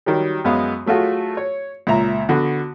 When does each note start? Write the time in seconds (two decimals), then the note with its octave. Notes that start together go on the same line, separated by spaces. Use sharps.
0.06 D#3 F#3 G3
0.44 F#2 G#3 B3 F5
0.86 F#3 A3 F4 F#4 G#4
1.37 C#5
1.87 C#2 A#2 E5 A#5
2.29 D3 B3 F#4